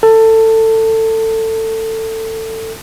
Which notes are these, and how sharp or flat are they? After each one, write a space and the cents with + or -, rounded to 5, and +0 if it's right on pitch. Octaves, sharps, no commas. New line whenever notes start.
A4 +20